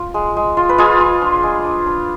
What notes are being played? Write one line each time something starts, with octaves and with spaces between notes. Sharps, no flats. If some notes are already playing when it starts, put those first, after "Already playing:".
Already playing: F4
G#3
G#3
F4
B4
G#3 F4 G#4
F4
D4
G#3
D4
D4